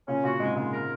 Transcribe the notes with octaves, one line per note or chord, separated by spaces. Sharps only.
A#2 C#3 C#4
A#2 C#3 F#4
G#2 C3 G#3
A#2 C#3 G#3
A#4